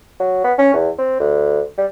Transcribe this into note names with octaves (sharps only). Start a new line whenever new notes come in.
F#3
B3
C#4
E2
C4
D2
G3